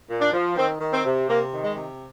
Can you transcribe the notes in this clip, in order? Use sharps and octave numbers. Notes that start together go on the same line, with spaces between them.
A#2
D4
F3
D#3 C4
D#3
C4
C3
C3 A#3
D#3
G#3
C3